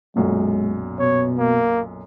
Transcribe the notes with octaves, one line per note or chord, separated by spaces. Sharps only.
B1 F#2 A#2 G#3
B2 C#5
A#3